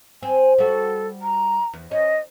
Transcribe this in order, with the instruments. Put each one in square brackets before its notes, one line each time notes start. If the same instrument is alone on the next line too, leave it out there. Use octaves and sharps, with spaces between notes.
[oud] C4 [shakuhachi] G#5
[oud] G3 F#4 [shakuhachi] A4
[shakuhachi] A#5
[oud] E2
[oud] C#4 [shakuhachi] D#5